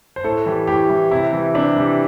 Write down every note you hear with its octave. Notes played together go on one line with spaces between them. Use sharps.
C5
A2 A4
E3 G3
A2 G4
E3 G3
C3 E4
E3 G3
C3 D4
E3 G3